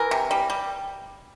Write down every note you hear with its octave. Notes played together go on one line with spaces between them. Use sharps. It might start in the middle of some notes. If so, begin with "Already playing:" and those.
Already playing: E3 A#4
C3
G3
G3